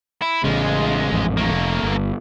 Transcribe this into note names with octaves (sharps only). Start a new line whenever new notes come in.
E4
A1 C#3 G#3 F4
A1 F2 G#2
A3 A#3
F1
G1